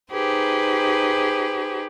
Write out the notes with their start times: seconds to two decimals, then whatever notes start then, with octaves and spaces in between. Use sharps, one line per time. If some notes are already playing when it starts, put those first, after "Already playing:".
0.12 D#4 G4 G#4 B4 C5